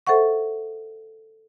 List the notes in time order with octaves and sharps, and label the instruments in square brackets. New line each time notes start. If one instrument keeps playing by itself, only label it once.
[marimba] A4 C5 E5 F#5 C#6